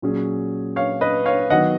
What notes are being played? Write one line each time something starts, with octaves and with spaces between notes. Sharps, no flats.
A#2 F#3 C#4 G#4
C#5 F5
B4 D#5
C#5 F5
D#3 F#3 B3 D#5 F#5